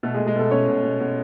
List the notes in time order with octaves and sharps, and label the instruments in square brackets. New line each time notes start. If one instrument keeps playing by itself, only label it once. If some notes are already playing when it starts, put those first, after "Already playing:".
[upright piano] B2 A3 A4
G#3 G#4
B2
G#3 G#4
B2 A3 A4
B2 C#4 C#5
B2
B2
B2